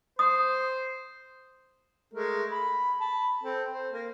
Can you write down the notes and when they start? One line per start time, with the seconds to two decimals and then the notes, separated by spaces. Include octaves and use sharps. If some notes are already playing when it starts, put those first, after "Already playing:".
0.19 C5 D#6
2.14 G#3 A3 A#4
2.51 B5
3.01 A5 B5
3.43 C4 A4
3.71 C5
3.93 A#3